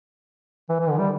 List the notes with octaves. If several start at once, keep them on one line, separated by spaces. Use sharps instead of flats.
E3
E3
D3
G3